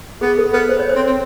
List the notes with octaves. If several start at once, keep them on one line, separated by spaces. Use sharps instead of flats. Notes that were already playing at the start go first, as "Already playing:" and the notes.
B3 G#4
A4
B3 B4
C5
C#5
C5
C4
C4